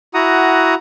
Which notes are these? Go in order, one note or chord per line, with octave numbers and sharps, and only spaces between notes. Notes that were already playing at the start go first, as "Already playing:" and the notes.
E4 F#4 F#5 A#5 D#6